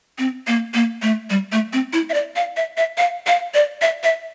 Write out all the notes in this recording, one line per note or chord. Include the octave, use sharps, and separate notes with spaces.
C4
A#3
A#3
A3
G3
A3
C4
E4
E5
D5
F5
E5
E5
F5
F5
D5
E5
E5